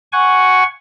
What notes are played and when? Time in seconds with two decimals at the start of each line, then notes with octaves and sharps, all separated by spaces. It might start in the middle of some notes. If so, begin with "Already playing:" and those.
0.13 F#5 G#5 C#6